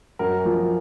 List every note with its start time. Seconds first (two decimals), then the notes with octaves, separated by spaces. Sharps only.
0.19 F#2 A#4
0.45 F3